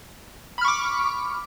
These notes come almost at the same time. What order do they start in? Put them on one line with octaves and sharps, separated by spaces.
B5 F6 C#6 D6